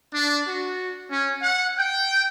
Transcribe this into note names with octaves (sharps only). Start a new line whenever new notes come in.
D4
F#4
C#4
F#5
G5